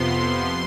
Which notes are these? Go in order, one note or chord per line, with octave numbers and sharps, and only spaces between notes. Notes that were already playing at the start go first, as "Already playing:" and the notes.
Already playing: F2 C3 F3 B3 C6